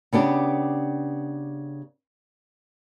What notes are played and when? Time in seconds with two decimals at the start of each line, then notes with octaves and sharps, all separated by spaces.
0.13 C#3 B3 D4 G4